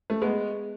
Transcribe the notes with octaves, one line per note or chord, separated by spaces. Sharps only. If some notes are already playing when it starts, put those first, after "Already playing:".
A3
G#3 B3